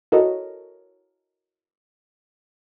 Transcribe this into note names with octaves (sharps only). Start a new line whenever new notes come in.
E4 F#4 A4 A#4 C#5 D#5